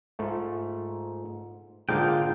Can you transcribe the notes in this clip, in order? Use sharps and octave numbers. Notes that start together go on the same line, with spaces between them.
G#2 A3 F4
G#2 D3 A#3 F4 G#4 G5